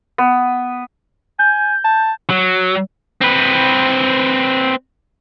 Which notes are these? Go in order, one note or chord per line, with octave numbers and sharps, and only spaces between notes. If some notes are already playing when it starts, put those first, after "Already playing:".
B3
G#5 G6
A5
F#3
C4 B4